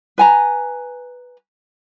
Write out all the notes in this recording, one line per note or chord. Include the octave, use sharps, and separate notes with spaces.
B4 G#5 A#5